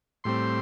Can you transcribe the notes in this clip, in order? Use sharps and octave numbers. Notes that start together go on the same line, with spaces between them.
A2 G3 C4 C6